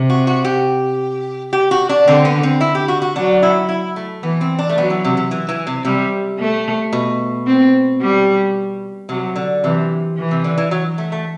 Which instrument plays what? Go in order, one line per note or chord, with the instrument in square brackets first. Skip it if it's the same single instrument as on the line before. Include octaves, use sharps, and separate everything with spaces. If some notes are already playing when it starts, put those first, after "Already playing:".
Already playing: [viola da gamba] C3
[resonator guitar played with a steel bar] F#4
F#4
G4
G4
F#4
D4
[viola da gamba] D3 [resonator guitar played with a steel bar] C4
[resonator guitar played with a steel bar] B3
C4
E4
G4
F#4
F#4
[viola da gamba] F#3 [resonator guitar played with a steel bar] D4
[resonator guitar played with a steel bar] E4
E4
A3
[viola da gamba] E3 [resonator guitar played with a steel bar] B3
[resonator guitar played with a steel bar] C4
D4
A3
[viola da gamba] F#3 [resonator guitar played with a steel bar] B3
[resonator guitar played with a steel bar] E3
C3
C3
E3
E3
C3
[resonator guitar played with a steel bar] C3 [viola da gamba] G3
[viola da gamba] A3
[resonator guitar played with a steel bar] B2
[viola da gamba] C4
G3
[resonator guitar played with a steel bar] C3 [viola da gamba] F#3
[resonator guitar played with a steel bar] D3
[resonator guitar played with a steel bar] C3 [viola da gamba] E3
[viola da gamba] E3
[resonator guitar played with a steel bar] C3
D3
E3
F#3
A3
A3